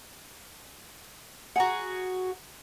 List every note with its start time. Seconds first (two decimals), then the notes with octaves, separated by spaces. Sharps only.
1.56 F#4 G#4 F#5 A#5